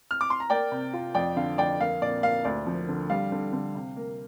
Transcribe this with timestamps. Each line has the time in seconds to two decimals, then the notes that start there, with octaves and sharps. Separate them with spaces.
0.11 F6
0.21 D6
0.30 C6
0.40 A#5
0.50 A#3 D5 G5
0.72 C3
0.93 F4
1.15 F2 D5 G5
1.36 D3 F5
1.58 F2 D5 G5
1.80 A#3 F5
2.02 A#2 D5
2.23 A#3 F5
2.45 D2 D5
2.67 F3
2.89 D3
3.10 G3 F5
3.32 D3
3.53 D3
3.75 C3
3.96 A#3